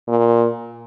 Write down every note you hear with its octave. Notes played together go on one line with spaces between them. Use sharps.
A#2